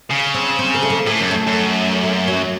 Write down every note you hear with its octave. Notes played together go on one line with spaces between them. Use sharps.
C#3
C4
C4
A#3
A3
A#3
A2 A#3
F#2
A3
F#2
A#3
F#3